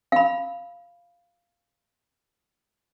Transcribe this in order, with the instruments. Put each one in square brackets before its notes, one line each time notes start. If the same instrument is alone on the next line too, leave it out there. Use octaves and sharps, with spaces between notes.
[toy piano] F5 B5